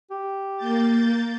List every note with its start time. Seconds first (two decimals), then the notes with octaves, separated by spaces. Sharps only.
0.11 G4
0.57 A#3 G6 A6